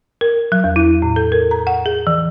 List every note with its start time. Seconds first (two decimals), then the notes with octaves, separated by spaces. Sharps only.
0.21 A#4
0.52 F#3
0.64 E2
0.76 E4
1.02 A2
1.16 A4
1.32 A#4
1.51 A#5
1.67 F#5
1.86 G#4
2.07 E3